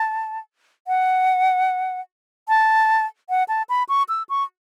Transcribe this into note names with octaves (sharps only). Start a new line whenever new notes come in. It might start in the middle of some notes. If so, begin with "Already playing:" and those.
Already playing: A5
F#5
A5
F#5
A5
B5
C#6
E6
C#6